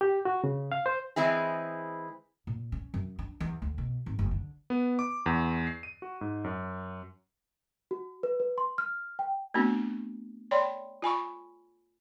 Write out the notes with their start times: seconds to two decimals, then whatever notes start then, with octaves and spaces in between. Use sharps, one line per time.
0.01 G4
0.25 F#4
0.44 C#3
0.72 F5
0.86 C5
1.16 E3 G#3 C4 E4 G#4
2.47 A#2
2.72 C#4
2.94 F#2
3.19 D4
3.40 E2
3.62 D2
3.78 B2
4.06 G#1
4.19 F#1
4.31 D3
4.70 B3
4.99 D6
5.26 E2
5.67 C7
5.83 D#7
6.02 F#4
6.21 G#2
6.44 F#2
7.91 F#4
8.23 B4
8.40 B4
8.58 C6
8.78 F6
9.19 G5
9.54 A3 B3 C4 D4 F#4
10.51 C#5 D5 G5 B5 C6
11.02 F4 G#5 B5 C#6